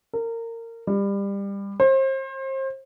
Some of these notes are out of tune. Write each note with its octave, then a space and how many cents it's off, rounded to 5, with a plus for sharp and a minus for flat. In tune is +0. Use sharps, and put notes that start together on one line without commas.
A#4 -25
G3 +25
C5 +35